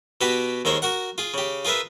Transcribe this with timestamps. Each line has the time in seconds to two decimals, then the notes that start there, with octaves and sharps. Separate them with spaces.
0.21 B2 F#4 G4 B4 B5
0.65 D#2 G#3 A#4 C5 C#5
0.82 F#4 A#4 F#5
1.18 F4 G#4
1.34 C#3 G4
1.65 F4 G#4 A#4 B4 E5